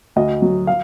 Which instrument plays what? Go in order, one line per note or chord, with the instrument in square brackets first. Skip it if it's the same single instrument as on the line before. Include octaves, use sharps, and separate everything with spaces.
[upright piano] D2 D#5
F#3
F5